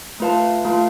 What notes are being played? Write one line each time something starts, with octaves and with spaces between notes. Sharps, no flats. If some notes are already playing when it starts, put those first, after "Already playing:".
A3 F4 B4 F5 A5
A3 F4 B4 F5 A5